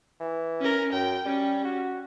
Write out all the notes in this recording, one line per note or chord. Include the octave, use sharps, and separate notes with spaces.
E3
C#4 A#4
F#2 G5
G3 C#4
F#4